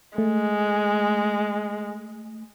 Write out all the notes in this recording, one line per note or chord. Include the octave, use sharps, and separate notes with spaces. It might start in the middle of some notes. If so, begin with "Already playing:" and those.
G#3 A3